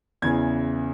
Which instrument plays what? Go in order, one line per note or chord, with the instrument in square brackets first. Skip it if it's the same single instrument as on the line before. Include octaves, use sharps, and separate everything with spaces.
[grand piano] E2 C#3 E3 G#6